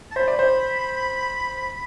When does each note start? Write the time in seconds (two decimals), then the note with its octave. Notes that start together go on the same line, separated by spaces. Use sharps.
0.12 A5
0.16 C5 B5
0.28 D5
0.39 C5